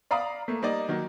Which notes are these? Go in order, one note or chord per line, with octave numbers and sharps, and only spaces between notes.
D5 F5 A#5 B5 D#6
A3 A#3
G3 A#3 D#4 D5 D#5
D#3 F#3 A#3